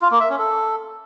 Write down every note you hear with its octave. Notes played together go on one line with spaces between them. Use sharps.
F4
A#3
E5
C#4
A4